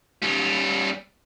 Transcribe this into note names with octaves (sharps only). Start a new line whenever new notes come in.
G3 C#4